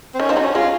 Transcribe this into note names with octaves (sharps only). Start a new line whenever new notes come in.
C4
D#3 C#4
F3 D#4
F#3
C#4
G#3 F4